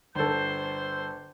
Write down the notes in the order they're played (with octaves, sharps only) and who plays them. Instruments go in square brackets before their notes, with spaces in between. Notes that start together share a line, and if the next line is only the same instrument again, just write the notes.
[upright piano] G1 A4 [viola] C5 [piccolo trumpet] G6